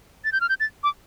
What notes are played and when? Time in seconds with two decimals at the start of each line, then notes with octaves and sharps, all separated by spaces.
0.25 A6
0.32 G6
0.41 F6
0.49 G6
0.60 A6
0.83 D6